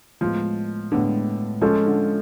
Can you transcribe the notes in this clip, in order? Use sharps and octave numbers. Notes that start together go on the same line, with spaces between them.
A2 F3 G#3 B3
A2 D3 G#3 B3
F3 G#3 C#4 F4 A4
D3